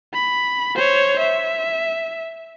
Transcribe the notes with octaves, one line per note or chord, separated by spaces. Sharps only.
B5
C5 C#5
E5